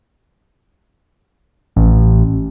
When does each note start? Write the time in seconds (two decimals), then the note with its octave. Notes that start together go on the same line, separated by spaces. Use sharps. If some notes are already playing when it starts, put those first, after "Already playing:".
1.76 A1